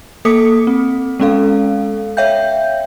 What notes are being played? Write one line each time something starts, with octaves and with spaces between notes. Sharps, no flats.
A#3 A4 D6 D#6 B6 C#7
C4
G#3 B3 C#4 A4 F5
C#5 E5 F5 G5 G6